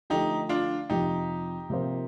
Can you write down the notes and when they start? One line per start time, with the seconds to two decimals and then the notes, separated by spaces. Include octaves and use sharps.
0.10 D3 F3 A3 D#4 G4
0.49 D4 F4
0.90 F2 C3 F3 D#4 G4
1.70 C3 F3 A#3 F4 C5